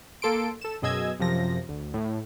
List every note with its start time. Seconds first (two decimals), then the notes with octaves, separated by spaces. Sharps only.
0.22 A#3 A4 C6 D7
0.61 A4 E7
0.82 F#2 B2 G#4 D#5 E6 G#6
1.19 F#2 C3 F3 A#6
1.69 D2
1.94 A2